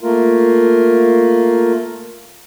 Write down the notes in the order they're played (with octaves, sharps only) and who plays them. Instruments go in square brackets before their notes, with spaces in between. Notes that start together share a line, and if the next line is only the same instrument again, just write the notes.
[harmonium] A3 A#3 F4 A#4